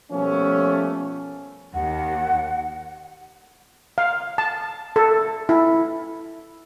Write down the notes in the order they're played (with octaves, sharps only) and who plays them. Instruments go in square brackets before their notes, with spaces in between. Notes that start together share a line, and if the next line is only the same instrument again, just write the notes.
[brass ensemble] B2 F3 G3 A3 A#3 C#4
[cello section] D#2 [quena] F#5
[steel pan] F5
A5
A4
E4